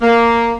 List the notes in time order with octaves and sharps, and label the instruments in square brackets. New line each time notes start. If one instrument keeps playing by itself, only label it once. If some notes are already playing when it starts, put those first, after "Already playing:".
[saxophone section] A#3